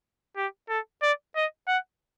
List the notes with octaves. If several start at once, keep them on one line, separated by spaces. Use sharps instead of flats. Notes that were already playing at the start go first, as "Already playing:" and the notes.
G4
A4
D5
D#5
F#5